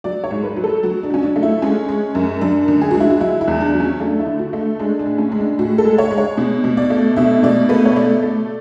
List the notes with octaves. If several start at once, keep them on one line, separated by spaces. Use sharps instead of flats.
F#3 D5
C#5
G#2
B4
F#3
A4
F#3 F#4
D4
F#3 C#4
D4
A3
E4
G#3 C#4
G#3
F#2
F#2 D4
D3
G#4
G#3 F#4
E4
F#4
F#3 E4
E4
E2
D4
F#3
C#4
A3 D4
E4
D3
F#4
A3
G#3 D4
D4
A2
C#4
G#3
D4
A2 F#4
A4
G#3
C#5
G#3
C#5
B2
B2
D5
A3
B2 E5
B2 D5
A3 B4
C#5
A3 D5
A3